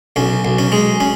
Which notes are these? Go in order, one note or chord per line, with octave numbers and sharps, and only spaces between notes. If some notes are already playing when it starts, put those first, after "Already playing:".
B1 C#4
B1
C#4
G#3
C#4